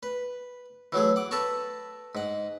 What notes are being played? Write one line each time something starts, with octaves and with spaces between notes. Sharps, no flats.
B4
E3 F#3 A3 G#4
F#5 D6
A4 B4 A5 A#5 C#6
G#2 F#5